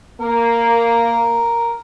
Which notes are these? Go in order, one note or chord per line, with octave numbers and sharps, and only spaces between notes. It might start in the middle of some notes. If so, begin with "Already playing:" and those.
A#3 A#4